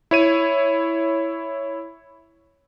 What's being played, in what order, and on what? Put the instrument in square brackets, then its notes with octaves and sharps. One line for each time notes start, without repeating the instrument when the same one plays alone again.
[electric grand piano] E4 C#5 D#7